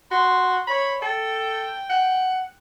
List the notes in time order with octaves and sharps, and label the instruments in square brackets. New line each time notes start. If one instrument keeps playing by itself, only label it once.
[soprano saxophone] F#4 [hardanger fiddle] C6
[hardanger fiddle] C#5 [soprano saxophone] B5
[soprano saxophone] A4 [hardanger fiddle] G5
[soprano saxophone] F#5